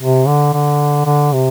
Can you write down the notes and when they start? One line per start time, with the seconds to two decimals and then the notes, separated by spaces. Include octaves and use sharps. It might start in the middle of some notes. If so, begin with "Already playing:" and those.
0.01 C3
0.27 D3
0.53 D3
1.06 D3
1.33 C3